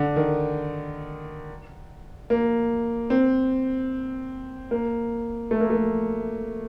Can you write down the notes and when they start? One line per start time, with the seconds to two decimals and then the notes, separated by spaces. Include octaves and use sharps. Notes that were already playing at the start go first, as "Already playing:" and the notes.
Already playing: D3
0.16 D#3
2.30 A#3
3.10 C4
4.71 A#3
5.51 A3
5.60 A#3
5.70 A3